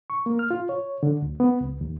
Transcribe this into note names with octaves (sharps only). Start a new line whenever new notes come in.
C#6
A#3
F6
F4
C#5
D3
D2
B3
C#2
D#2